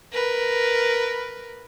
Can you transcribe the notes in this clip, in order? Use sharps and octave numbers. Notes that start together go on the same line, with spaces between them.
A#4 B4